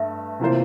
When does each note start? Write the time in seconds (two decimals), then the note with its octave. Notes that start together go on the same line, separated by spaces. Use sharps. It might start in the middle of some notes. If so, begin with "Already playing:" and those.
Already playing: G2 A3 E5
0.40 C3 E3 A#3 F4 C5